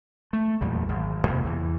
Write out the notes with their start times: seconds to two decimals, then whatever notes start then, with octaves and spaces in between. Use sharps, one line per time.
0.33 A3
0.61 E2 A#2 F#3 G3
0.89 G#1
1.27 F2 C3 A#3
1.44 E2 E3